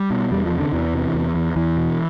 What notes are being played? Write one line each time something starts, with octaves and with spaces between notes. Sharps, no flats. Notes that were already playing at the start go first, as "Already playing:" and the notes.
Already playing: G3
B2
E2 G3
F3
C3
D3
E2 E3
C3
E2
E2
E2 E3
B2